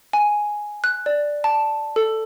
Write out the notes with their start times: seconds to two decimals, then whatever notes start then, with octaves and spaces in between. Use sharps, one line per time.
0.13 G#5
0.84 F#6
1.06 D5
1.44 A5
1.96 A4